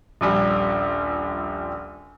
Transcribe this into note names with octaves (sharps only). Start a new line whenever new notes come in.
D#1 A#1 G3